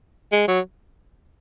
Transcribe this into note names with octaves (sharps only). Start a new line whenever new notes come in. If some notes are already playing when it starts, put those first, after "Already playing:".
G#3
F#3